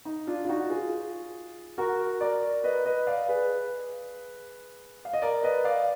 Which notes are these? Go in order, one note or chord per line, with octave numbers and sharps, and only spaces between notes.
D#4
D4 F4
F4
D#4 F#4
F4 G#4
F#4 A#4
A#4 D5
B4 D#5
B4 D#5
D5 F5
G#4 B4
F5
D#5
A#4 D5
B4 D#5
D5 F5